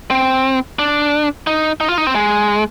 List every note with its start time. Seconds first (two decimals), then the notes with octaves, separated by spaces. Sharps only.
0.11 C4
0.79 D4
1.47 D#4
1.81 D#4
1.89 F4
1.98 D#4
2.07 C4
2.15 G#3